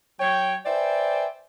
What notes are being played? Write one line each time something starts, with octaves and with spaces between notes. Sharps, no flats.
F#3 C#5 G5
B4 C5 D5 E5 G5 G#5